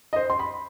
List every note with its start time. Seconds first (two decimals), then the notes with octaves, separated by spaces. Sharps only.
0.13 D#5
0.16 C5
0.30 C6
0.39 B5